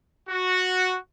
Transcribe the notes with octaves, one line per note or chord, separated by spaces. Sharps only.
F#4